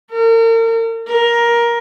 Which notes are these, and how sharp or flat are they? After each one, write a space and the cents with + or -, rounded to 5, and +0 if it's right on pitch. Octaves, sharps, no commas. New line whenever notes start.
A#4 -40
A#4 +15